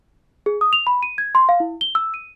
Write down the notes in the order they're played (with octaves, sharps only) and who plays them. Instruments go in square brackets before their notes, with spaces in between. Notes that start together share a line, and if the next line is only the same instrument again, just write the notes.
[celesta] G#4
D#6
F7
B5
D#7
G#6
C6
F5
E4
G7
E6
D#7